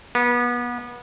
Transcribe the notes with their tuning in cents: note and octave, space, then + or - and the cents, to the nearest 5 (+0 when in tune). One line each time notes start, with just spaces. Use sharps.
B3 -30